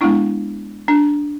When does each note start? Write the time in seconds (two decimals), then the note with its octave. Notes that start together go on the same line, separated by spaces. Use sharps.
0.01 G#3 B3 D4 E4
0.88 D4